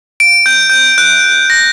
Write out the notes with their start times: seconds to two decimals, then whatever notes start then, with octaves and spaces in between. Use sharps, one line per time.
0.20 D7
0.46 G6
0.70 G6
0.98 F#6
1.50 A#6